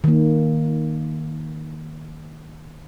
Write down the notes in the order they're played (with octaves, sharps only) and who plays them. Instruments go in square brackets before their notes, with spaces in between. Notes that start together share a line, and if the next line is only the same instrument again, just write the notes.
[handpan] D#3 A#3